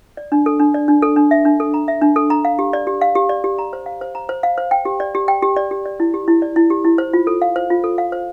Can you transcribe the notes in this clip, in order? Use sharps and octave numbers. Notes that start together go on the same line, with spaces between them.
D5
D4
A4
D4
D5
D4
A4
D4
E5
D4
A4
A#5
E5
D4
A4
A#5
F5
G4
D5
G4
F5
G4
D5
G4
A#5
C5
F5
C5
A#5
C5
F5
C5
G5
G4
D5
G4
G5
G4
D5
G4
D5
E4
G4
E4
D5
E4
G4
E4
C5
F4
A4
F5
C5
F4
A4
F5
C5